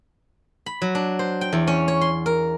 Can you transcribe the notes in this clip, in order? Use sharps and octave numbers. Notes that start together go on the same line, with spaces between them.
B5
F#3
D4
C5
G5
E2
C#4
C#5
C6
A#4